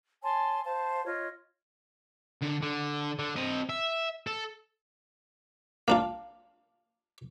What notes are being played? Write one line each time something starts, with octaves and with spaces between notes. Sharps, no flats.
C#5 G#5 A5 C6
C5 F5 A5
F4 C#5 D#5
D3
D3
D3
C4 D#5
E5
A4
A#3 D4 F4